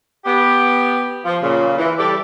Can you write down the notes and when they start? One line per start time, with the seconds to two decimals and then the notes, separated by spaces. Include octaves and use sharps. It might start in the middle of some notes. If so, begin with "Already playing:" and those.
0.25 B3 G4
1.25 F3
1.41 A#2 C#3
1.78 E3
1.98 G3 G4 A4 D5